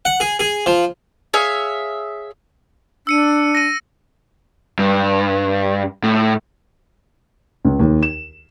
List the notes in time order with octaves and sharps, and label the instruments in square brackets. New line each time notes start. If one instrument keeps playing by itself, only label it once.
[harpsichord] F#5
G#4
G#4
F3
[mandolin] G#4 C#5 E5 F5
[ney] D4 [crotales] E6 C#7 D#7
[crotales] A#6 D#7
[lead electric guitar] G2
A2
[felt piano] C#2
D#2
E7